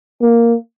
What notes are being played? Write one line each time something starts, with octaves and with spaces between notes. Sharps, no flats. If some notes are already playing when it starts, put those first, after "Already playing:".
A#3